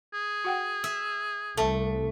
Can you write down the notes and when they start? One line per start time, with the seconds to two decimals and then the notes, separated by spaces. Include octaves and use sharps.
0.14 G#4
0.44 F#4 F#5 G5
0.84 E5
1.57 C2 A3 A4 E5 A5